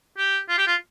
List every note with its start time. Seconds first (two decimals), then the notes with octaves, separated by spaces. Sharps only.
0.18 G4
0.49 F4
0.58 G4
0.67 F4